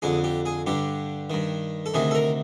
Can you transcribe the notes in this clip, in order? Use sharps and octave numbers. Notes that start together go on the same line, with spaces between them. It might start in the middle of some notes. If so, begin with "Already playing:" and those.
F2 D3 G#4
G4
G#4
G2 D3 G4
G2 D#3
A4
D2 C3 D#3 G#4
A4
A#4